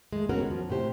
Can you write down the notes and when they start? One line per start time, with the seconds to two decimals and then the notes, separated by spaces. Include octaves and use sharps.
0.13 G#3 A3
0.29 D3 B3 C#4 F4 F#4 A#4
0.46 F#2 F3
0.70 A2 C3 G4 C5